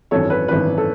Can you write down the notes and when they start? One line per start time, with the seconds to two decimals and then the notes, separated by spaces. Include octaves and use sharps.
0.11 G#1 F#2 E3 A4 C#5
0.30 B4
0.48 G#1 F#2 E3 B4
0.78 A4